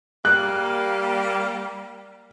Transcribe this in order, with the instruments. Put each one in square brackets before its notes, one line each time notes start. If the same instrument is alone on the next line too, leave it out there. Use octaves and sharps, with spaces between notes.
[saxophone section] G3 A#3 [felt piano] F#6